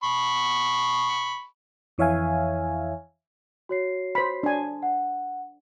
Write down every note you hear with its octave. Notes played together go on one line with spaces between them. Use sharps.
B5 C#6
F2 E3 C#5 E5 F5 G#5
F#4 C#5 C7
C5 B5
D4 G#5
F#5